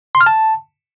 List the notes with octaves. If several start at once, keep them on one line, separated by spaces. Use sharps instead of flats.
C6
F6
A5